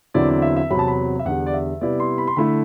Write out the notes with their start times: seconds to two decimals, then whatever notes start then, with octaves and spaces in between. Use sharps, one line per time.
0.14 E2 D3 F#3 C4 E4 D5
0.29 D5
0.42 E5
0.56 E5
0.70 E2 C3 F#3 C4 B5
0.79 A5
0.88 B5
1.19 E5
1.25 E2 D3 G3 F#5
1.46 D5
1.53 E5
1.81 C3 G3 B3 E4 D5
2.00 C6
2.18 B5
2.27 C6
2.36 D3 A3 E4 B5